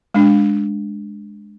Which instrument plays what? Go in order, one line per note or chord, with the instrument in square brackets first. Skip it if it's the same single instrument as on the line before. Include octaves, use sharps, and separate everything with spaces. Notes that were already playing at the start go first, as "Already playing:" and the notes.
[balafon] G#3 D4